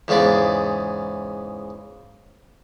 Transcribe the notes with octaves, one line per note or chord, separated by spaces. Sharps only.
E2 G#2 C#3 G#4 D5